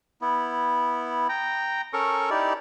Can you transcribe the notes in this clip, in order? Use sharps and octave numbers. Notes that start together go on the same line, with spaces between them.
B3 E4
G5 A#5
C#4 A4 A#4 C#6
D#4 E4 G4 D5